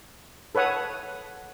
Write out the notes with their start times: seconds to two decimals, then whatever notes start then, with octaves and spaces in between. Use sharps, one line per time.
0.55 A4 B4 C#5 F#5 D#6